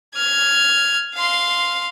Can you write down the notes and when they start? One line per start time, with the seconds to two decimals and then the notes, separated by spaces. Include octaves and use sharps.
0.16 F6 G#6
1.15 F5 C6